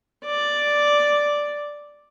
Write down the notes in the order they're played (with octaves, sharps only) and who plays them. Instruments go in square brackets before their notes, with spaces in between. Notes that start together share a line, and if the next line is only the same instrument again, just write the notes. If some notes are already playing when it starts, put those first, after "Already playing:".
[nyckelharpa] D5